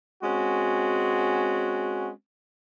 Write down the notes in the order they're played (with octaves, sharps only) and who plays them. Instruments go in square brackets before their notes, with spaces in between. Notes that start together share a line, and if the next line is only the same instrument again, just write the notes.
[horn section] G#3 C4 C#4 F#4